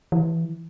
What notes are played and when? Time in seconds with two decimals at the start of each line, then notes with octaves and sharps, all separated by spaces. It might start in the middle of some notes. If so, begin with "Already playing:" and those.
0.12 E3